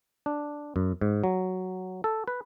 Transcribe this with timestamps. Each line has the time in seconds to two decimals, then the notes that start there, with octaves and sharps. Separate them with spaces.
0.26 D4
0.76 F#2
1.01 G#2
1.24 F#3
2.04 A4
2.28 B4